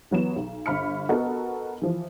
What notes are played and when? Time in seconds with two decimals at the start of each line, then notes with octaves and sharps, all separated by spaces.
0.11 E3 F#3 B3 E7
0.36 B1
0.66 G1 B5 F6 C#7
1.09 B3 F#4 A4 A#4 D#5
1.82 E3 F3